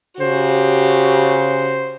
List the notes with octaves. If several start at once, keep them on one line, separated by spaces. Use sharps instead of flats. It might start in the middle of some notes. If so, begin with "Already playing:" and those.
C#3 F#4 G4 C5